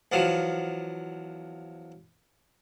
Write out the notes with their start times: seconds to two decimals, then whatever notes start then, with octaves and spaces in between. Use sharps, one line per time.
0.12 E2 F3 F#3